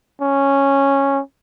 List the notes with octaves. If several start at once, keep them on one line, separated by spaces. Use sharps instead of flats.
C#4